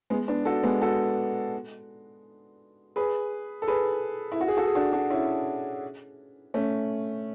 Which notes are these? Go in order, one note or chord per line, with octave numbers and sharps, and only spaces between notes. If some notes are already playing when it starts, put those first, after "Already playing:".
G#3 B3
B3 D4
F#4 A4
G#3 B3
F#4 A4
G#4 B4
A4
G#4 B4
E4
F#4
G#4
F#4 A4
G#4
D4 F#4
D4 F#4
C#4 E4
A3 C#4